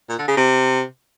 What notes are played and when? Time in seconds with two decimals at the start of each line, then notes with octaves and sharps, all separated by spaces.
0.09 A#2
0.18 D3
0.28 C#3
0.37 C3